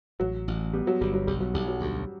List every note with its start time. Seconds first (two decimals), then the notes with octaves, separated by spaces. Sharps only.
0.20 A1 F#3
0.48 A1
0.73 G3 B3
0.87 F#3
1.01 G1 G3
1.14 F#3
1.27 B1 G3
1.40 F#3
1.54 B1 G3
1.68 F#3
1.81 D2 G3